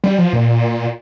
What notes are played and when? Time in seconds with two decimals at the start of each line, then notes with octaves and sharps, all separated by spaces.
0.04 G3
0.18 F3
0.33 A#2